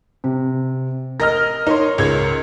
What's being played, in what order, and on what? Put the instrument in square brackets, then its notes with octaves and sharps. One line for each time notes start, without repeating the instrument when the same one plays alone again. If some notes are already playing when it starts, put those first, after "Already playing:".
[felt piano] C3
[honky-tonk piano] A#4 D#5 F6 [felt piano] A#6
[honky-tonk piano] D#4 [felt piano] A#4 C#5 C6
[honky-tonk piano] C#2 G#6